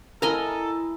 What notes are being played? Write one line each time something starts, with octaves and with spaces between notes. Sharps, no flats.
E4 A4 A#4 D#5 G#5 A#5